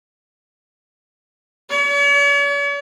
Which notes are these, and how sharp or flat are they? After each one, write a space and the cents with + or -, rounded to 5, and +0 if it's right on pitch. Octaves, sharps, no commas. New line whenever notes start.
C#5 +45